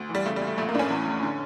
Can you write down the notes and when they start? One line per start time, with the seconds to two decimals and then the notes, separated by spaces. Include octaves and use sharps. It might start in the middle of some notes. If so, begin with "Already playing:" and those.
Already playing: D2
0.09 E3
0.15 G3
0.26 C#3 A3
0.36 G3
0.42 D2
0.47 A3
0.58 A#1 A3
0.69 A#3
0.74 A2 D4
0.79 C#4
0.90 E2
1.06 F1
1.23 D3